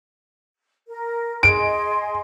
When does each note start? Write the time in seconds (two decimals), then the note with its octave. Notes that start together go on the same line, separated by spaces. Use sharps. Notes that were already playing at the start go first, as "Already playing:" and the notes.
0.88 A#4
1.43 G#4 D#5 C6 D7